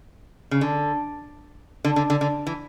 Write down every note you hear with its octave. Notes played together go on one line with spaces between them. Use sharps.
C#3
D3
D3
D3
D3
D3
E3